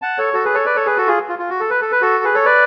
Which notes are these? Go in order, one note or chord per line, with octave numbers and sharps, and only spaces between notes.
F#5 A5
A4 C#5
F#4 A4
G#4 B4
A4 C#5
B4 D5
A4 C#5
G#4 B4
F#4 A4
F4 G#4
F4
F4
F#4
A4
B4
A4
B4
F#4 A4
G#4 B4
A4 C#5
B4 D5